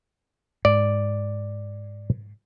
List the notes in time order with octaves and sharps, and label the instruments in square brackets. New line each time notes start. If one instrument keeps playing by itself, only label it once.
[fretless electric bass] G#2 [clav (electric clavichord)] D5